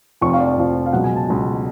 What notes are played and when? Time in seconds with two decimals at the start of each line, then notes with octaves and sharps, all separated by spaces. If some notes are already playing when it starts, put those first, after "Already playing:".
0.21 F1 F2 F3 C#6
0.33 F5
0.40 D5
0.57 F1 F2 F3
0.86 F5
0.93 C#2 B2 F#3 F#5
1.04 G#5
1.16 A5
1.27 C#2 B2 F#3 A5